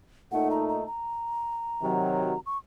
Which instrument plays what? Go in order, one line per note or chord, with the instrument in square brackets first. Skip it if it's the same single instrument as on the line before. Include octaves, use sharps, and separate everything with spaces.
[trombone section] A#2 A3 D#4 A4 [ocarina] F#5
[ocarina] A#5
A#5
A#5
[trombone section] C3 D#3 F#3
[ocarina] C#6